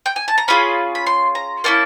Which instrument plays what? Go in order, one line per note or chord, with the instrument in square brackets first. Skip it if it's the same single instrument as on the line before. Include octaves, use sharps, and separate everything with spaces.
[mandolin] G5
G#5
A5
A#5
C#4 F4 G#4 B5
B5
C6
A#5
A#3 C#4 E4 A5